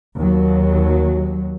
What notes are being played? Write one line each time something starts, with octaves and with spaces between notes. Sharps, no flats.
D#2 F#3